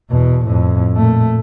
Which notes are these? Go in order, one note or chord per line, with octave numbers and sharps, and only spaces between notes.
E2 B2
F2 A2
A#2 A3